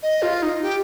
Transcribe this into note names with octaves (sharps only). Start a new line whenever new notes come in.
D#5
F4
D#4
G4